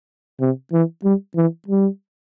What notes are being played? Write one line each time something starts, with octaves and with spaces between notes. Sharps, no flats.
C3
E3
G3
E3
G3